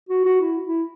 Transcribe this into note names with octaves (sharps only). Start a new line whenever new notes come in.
F#4
F#4
E4
E4